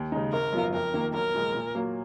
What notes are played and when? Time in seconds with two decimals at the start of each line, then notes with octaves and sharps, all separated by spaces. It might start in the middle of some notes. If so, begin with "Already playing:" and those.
Already playing: D#2
0.12 C#3 G#3 D#4
0.32 G#1 A#4
0.53 F#2 F3 B3 F4
0.73 F2 A#4
0.94 D#3 A#3 F4
1.14 B1 A#4
1.34 A#2 F3 G#3
1.55 A#2
1.75 F#3 A#3